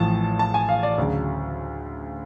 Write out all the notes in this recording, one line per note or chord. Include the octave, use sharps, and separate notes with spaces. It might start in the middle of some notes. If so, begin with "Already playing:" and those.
Already playing: A1 A2 F3 A5
A5
G#5
F5
D5
D2 C#3 F#3